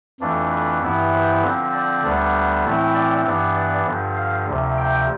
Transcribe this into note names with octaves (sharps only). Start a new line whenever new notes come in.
F2 E3 A3 D4
B4
G2 E3 B3 E4
C5
D3 F3 C4
D5
D2 D3 G3 B3 D4
A2 E3 A3 C4 E4
D5
G2 E3 B3 D4
D5
G2 D3 F3
F5
D2 C3 F3
G5